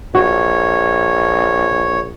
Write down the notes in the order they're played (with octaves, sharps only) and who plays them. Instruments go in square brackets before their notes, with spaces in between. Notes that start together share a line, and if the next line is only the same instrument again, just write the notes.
[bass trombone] A#1 [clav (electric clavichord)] F#4 [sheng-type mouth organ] C#5